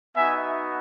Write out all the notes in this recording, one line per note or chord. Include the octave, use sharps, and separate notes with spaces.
B3 D#4 F#4 E5 G#5